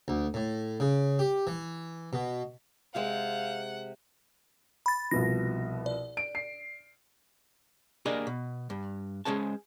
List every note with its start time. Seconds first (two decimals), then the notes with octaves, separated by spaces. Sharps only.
0.08 D2
0.34 A2
0.80 C#3
1.19 G4
1.47 E3
2.13 B2
2.95 C3 G#3 C4 F5 F#5
4.86 B5 A6
5.11 C2 B2 F3 A#6
5.86 D5
6.17 D7
6.35 C7
8.06 A#3 D4 G4 G#4 A#4 D#5
8.27 B2
8.70 G2
9.25 G#3 C#4 G#4 C5 A5